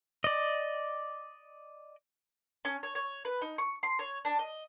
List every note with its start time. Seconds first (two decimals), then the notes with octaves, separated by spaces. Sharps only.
0.24 D5 D#5
2.65 C#4
2.83 C#5
2.95 C#5
3.25 B4
3.42 D#4
3.58 C#6
3.83 C6
3.99 C#5
4.25 D4
4.39 D#5